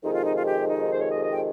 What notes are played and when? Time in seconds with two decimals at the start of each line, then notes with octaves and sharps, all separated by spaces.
0.03 F2 C3 D#3 G#3 D#4
0.14 F4
0.25 D#4
0.35 F4
0.46 G4
0.68 D#4
0.89 C5
1.01 C#5
1.11 D#5
1.22 D#5
1.33 G5